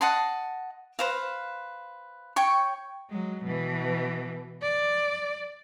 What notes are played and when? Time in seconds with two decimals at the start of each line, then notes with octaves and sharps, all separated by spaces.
0.01 D#5 F#5 A5 C6
0.99 B4 C5 F5
2.36 C#5 G5 C#6
3.09 F#3 G#3
3.44 B2 E3
4.61 D5